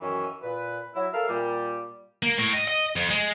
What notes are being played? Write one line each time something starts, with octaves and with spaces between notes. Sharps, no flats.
F#2 D#3 E3 C#4
A#2 B4
F#3 E4
A4 A#4 E5 F5
A#2 G3
A#3
A2
D#5
D#5
F2
G#3